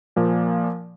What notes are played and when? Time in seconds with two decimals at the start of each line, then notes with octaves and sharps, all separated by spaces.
0.16 A#2 F3 A#3